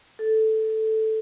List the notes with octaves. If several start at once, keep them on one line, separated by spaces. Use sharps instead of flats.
A4